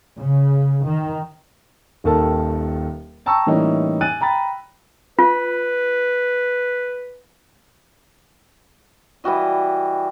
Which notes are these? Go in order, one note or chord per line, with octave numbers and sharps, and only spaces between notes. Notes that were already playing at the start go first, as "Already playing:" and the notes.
C#3
D#3
D#1 D#2 D#3 A4 A5
G5 A5 A#5 C#6 E6
A2 E3 G3 A#3 C#4 D#4
G#5 F#6 A6 D#7
G5 A#5 B5 A6
F4 B4
E3 G3 F#4 D#5